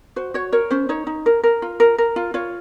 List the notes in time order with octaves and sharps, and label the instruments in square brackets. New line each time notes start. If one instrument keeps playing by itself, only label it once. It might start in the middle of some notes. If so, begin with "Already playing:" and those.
[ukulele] F#4 C5
F#4 C#5
A#4 C#5
C#4 C5
D#4 C#5
D#4
A#4
A#4
F4
A#4
A#4
F4
F4 C#5